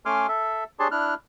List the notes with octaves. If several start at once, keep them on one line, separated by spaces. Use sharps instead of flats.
A3 C#4 G#5 C6 D6 F6
A4 E5
D4 G4 G#4 C#5 A5 C6
D4 E4 F6 F#6